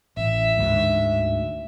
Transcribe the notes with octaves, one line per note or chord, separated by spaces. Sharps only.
A1 E5
D2 G#2